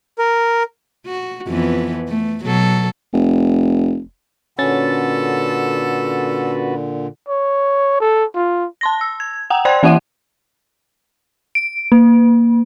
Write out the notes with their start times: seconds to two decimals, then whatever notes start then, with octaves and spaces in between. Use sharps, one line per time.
0.18 A#4
1.06 F#4
1.48 F2 E3 B3
2.08 A3
2.42 B2 F#3 A4
3.13 F1
4.59 A#2 D3 C#4 F#4 A4 B4 A6
7.29 C#5
8.00 A4
8.35 F4
8.81 A5 C6 A#6
9.01 E6
9.20 G#6
9.50 F#5 G5 A#5
9.65 C5 D5 G5 C6 F#6 G#6
9.83 E3 A#3 E4 E5 F#5 D#7
11.55 D7
11.92 A#3